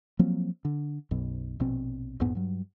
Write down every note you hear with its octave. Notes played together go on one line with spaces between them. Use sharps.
F3 F#3 A#3 C4
D3
B1 F#2 B2
A#1 B2 C4
A#1 E2 G#2 B3
G2 F#3